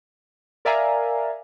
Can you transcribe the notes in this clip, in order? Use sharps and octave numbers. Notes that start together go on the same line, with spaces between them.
A#4 D5 E5 F5 G#5 A#5